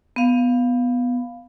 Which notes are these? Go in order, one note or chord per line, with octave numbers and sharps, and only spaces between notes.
B3 F5